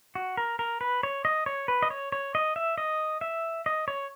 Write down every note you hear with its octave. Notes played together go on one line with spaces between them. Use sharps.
F#4
A#4
A#4
B4
C#5
D#5
C#5
B4
D#5
C#5
C#5
D#5
E5
D#5
E5
D#5
C#5